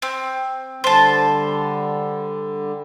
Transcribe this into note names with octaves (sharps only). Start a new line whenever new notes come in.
C4
D3 G3 C5 A5